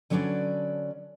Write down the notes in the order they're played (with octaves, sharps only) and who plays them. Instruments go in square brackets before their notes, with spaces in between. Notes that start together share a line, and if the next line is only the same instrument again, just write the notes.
[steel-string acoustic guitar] D3 F#3 C#4 D4 B4 D5